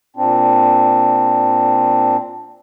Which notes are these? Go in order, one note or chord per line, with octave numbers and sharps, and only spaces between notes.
A#2 C4 D4